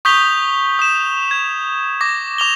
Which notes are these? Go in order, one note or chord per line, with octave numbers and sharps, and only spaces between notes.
C#6 D#6 G6 B6 F7 G7
D#6 E7
G#6
D6 A#6
D6 F7 G7